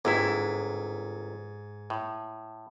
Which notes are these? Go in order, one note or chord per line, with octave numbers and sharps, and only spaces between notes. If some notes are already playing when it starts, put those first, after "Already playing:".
G1 G#2 C3 E4
A2